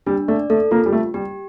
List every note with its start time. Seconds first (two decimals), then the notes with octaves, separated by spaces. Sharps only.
0.06 G3 D4
0.28 A3 D5
0.50 A3 A4
0.71 A#3 F4
0.86 G3
0.93 A3 G4
1.14 G3 G4